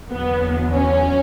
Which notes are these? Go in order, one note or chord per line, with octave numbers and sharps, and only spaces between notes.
E2 D3 F#3 B3
C#4